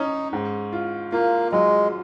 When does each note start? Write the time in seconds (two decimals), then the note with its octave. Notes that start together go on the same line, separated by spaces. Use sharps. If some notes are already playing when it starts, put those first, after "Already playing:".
Already playing: C#4 D#4
0.33 G#2
0.73 F4
1.12 A#3 F4
1.52 F#3 G#3